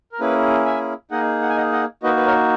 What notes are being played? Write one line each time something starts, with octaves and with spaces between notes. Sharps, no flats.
A#4
A#3 C#4 E4 G#4 B4
E5 G#5
A#3 D#4 G#4 D#5 F#5
F#5
G#5
D#5 F#5
D#5 F#5
A#3 D#4 F#4 B4 D#5
B4
A#4 C#5